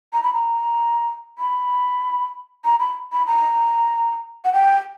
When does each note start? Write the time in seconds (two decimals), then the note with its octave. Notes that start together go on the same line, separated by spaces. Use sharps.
0.13 A#5
0.23 B5
0.33 A#5
1.38 B5
2.65 A#5
2.80 B5
3.12 B5
3.27 A#5
4.44 F#5
4.53 G5